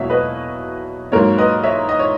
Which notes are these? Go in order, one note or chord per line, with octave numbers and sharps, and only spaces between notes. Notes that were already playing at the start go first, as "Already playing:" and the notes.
Already playing: E2 B2 F#3 A#3 C#5 E5 F#5
B4 D#5
G#2 F#3 A#3 A#4 C#5
B4 D#5
C#5 E5
D#5
C#5